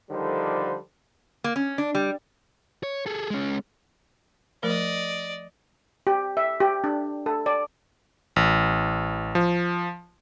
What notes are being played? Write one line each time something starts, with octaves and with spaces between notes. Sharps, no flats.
D3 D#3 F3 G3 A4 C5
A#3
C#4
D4
G3
C#5
G#4 A4
G#3 C#4
F3 A3 A#4 D5 D#5
G4
E5
G4
D4
A4
D5
A1
F3